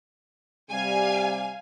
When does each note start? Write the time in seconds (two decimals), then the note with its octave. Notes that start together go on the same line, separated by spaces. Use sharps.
0.70 C3 G3 F5 G#5